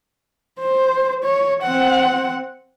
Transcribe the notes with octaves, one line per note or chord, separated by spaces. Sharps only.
C5
C#5
C4 F#5